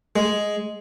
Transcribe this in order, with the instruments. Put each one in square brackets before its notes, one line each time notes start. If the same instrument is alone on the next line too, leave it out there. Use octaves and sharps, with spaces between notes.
[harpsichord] G#3